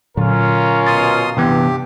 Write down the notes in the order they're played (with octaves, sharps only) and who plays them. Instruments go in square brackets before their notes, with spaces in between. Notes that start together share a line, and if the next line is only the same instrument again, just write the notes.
[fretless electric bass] A#2 D3 F#3 [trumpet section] C#4 F4 A#4
[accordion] B2 C6 D#6 [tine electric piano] A6
[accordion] G2 G4 [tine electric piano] C3 E3 B3